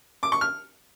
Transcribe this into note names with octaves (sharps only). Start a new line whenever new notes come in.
D6
C#6
F6